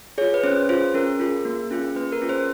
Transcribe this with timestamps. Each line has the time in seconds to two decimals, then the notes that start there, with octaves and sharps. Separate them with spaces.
0.18 F4 G#4 C#5
0.34 B4
0.44 C#4 C5
0.69 F4 G#4 C5
0.94 C#4 A#4
1.20 F4 G#4
1.45 A#3
1.71 C#4 F4 G#4
1.96 A#3 B4
2.12 A#4
2.21 C#4 F4 G#4
2.29 C5